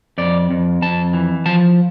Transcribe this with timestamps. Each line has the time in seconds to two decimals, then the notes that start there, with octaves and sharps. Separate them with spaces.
0.18 F2 D5
0.51 F2
0.82 F2 A5
1.13 E3
1.46 F3 A5